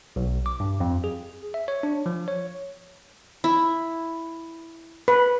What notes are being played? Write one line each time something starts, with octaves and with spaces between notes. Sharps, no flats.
B1
D6
G2
F2
G#4
E5
C#5
D4
F3
C#5
E4
B4